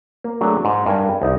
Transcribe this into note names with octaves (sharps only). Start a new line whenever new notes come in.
A#3
F#3 A3 D4 G#4
G#2
G2 A#4 G#5
C2 D#4